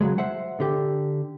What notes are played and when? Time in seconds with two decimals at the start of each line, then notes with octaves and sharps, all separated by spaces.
0.01 C#3 F#3 G#3
0.18 C5 E5 F#5
0.60 D3 G4